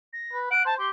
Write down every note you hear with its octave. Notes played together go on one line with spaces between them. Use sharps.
A#6
B4
F#5 D7
C5 A5
G4 C6